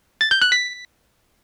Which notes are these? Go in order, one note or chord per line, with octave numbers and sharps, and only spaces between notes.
A6
G6
F#6
B6